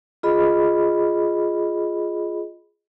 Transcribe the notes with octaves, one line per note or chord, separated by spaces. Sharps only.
F4 G#4 D#5 B5